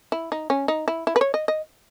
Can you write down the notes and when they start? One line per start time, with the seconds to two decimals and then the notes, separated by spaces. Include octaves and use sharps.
0.12 E4
0.32 D#4
0.50 C#4
0.68 D#4
0.88 E4
1.07 E4
1.16 B4
1.21 C#5
1.34 D#5
1.48 D#5